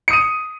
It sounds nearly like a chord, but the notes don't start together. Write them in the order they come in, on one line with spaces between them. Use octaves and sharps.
C#7 D#6 D#7